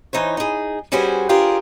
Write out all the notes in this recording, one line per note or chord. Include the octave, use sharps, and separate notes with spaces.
E3 D#4 C5 C#5
D#4 G#4
G3 C#4 F#4 G#4 B4 C5
D4 F4 G4 G#4 A#4 C5